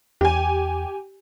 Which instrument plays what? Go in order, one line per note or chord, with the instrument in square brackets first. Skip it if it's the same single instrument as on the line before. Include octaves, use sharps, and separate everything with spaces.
[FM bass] E2 [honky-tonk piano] G4 G#5